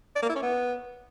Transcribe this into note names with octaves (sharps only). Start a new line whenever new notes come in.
D5
A#3
E4
C#4
B3